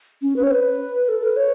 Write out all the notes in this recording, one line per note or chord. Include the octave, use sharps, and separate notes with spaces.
C#4
B4
C#5
B4
A4
B4
C#5